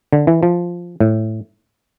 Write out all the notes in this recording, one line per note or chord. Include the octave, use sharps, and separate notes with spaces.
D3
E3
F3
A2